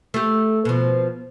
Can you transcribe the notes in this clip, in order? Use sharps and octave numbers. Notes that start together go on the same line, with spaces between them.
A3 G4
B2 F3